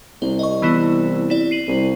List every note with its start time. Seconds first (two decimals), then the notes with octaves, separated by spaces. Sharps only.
0.22 C2 C5
0.39 D#5 C#6
0.62 E3 B3 E4
1.30 E4 D5
1.51 C7 D#7 F#7
1.68 C2